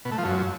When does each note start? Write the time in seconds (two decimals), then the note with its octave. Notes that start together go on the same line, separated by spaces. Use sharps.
0.05 B2
0.12 A3
0.18 F3
0.25 F#2